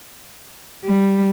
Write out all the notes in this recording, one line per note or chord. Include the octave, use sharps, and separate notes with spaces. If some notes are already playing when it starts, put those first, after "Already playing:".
G3